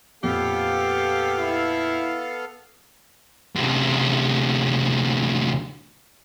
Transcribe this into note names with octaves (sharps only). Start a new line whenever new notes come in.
F2 A#2 B3 G4 A4 F5
E4
D2 C3